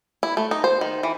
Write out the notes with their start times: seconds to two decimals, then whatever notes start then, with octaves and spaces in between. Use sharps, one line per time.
0.23 E4
0.37 A3
0.51 D#4
0.64 C5
0.81 D#3
1.03 E3